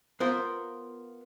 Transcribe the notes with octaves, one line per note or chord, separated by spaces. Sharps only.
B3 F4 A#4 C5